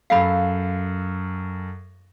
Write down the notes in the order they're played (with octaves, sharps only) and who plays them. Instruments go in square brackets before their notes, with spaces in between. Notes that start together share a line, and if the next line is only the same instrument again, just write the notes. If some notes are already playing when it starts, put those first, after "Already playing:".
[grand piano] F#2 A4 C7 [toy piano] F5 B5